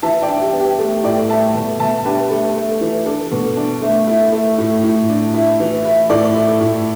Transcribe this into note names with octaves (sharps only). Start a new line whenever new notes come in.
E3 E5 A5
D5 G5
D4
G4
B3
G4
A3 A4
A2 D5 G5
A3 E5 A5
B2
B2 E5 A5
D4 G4 B4
A3 A4
A3
E3
D4 A4
B2
D4
A3
E4
A3
A2
A2
D4
E4
E3
E4
A2 A4 D5
E4
A2